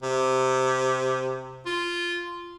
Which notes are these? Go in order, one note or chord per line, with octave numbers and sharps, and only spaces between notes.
C3
F4